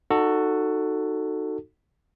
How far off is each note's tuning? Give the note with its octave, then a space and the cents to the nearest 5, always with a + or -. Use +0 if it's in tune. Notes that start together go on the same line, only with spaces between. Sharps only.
D#4 -20 F#4 +0 A4 +15